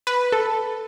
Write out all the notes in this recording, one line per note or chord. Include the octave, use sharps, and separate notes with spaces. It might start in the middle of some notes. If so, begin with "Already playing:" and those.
B4
A4